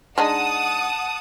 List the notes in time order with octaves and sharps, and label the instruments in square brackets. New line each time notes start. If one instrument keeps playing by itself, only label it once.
[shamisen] G#3 D4 D#4 [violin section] F#5 A5 D#6